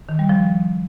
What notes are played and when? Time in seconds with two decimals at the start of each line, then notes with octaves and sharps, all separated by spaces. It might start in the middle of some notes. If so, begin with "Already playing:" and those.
0.09 D#3
0.19 G3
0.29 F3